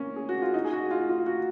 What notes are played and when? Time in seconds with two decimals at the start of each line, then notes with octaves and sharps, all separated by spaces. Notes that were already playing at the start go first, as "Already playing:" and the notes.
Already playing: A#3 C#4
0.16 G#4
0.29 F#4
0.42 F4
0.54 D#4
0.65 G#4
0.73 F#4
0.91 F4
1.09 F4
1.26 F#4